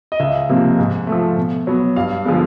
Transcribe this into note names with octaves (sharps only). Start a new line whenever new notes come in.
D#5
C#2 E5
C3 F3 A#3
G#2
A3
F3
B2
F#3 B3
G2 F5
D3 F3 G#3 B3